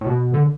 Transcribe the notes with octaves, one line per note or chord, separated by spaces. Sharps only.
A2
B2
D3